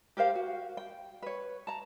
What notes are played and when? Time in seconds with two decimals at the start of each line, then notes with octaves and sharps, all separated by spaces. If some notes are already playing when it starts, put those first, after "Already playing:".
0.17 G4 A#4 C5 F5
0.35 F#4
0.77 G5
1.22 B4 C#5
1.67 A5 A#5